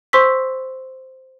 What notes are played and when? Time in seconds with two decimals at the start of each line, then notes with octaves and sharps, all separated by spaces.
0.13 C5 C6 C#6 E6 B6